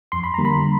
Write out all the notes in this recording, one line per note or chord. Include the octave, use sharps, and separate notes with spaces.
F2 C6
B5
D3 G3 A#3 A#5
B5